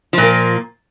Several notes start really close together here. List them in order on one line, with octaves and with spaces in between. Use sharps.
F3 A#2 A#3